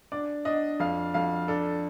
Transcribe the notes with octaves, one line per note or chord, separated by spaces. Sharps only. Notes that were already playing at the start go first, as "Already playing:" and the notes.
D4 D5
D4 D#5
F2 F5
F2 F5
D4 A4